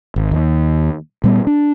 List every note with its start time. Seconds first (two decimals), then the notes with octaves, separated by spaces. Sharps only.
0.16 G#1
0.32 D#2
1.24 A#2 G3 B3
1.47 D4